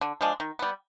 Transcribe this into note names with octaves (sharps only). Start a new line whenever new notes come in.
D3
F3 G#3 D4
D#3
G3 B3